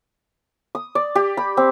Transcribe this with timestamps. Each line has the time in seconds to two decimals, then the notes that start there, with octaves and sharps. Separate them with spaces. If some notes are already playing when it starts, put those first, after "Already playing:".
0.75 D#6
0.95 D5
1.15 G4
1.37 B5
1.57 C4